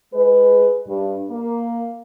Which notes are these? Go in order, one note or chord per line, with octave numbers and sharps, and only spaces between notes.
G#3 G#4 B4
G2
A#3